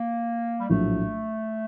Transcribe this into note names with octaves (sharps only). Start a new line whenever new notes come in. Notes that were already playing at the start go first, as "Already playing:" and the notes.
Already playing: A#3
G3
A#1 A2 F#3 A3